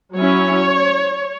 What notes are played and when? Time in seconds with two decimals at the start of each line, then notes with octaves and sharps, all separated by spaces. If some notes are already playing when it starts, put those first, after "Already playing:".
0.16 F#3 C#4 E4 C#5